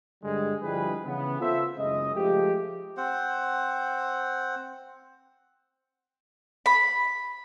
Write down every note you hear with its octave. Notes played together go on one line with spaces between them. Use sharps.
G2 D3 G3 G#3
D3 F3 G3 E4 G#4 B4
C#3 E3 B3
B3 F4 A4 C5 E5
F#1 C#3 G#3 D#5
F3 G#3 A3 G4
C4 C5 F#5
B5